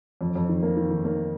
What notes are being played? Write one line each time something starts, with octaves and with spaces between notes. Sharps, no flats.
F2
F2
D#3
A#3
D#3
D#3
A#3